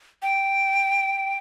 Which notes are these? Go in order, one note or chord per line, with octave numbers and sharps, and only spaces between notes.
G5